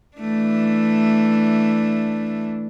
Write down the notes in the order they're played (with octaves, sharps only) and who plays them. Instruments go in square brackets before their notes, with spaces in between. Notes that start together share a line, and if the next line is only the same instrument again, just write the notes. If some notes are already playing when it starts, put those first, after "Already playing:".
[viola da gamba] E3 A3 D4